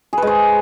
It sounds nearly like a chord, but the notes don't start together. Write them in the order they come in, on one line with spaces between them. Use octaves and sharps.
G#4 B4 G#3 C5